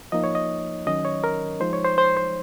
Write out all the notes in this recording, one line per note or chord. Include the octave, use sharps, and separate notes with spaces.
F3 A#3 D#4 D#5
C#5
D#5
D#3 F#3 C#4 D#5
C#5
A#4
F3 G#3 D#4 C5
C#5
C5
C5
C5